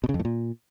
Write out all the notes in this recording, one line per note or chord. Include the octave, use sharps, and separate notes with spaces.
B2
C#3
F2
A2
A#2